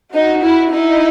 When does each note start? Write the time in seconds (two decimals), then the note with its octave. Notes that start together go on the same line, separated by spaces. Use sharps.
0.14 D#4 F#4
0.42 E4
0.72 D#4 E4